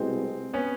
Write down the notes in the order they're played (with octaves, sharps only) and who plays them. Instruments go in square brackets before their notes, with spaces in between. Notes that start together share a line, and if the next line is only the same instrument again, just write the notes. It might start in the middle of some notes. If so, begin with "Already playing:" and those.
Already playing: [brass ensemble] C2 B2 G#3 [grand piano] C4
[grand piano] B3 C#4